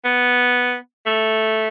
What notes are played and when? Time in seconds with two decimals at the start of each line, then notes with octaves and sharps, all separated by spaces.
0.04 B3
1.06 A3